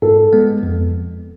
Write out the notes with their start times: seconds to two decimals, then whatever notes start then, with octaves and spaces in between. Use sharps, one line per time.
0.02 G#2 A4
0.33 G#3 B3
0.63 F2